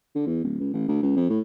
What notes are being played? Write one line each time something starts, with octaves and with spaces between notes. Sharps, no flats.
D3
E2
D1
C#2
A1
D2
C#2
F2
A2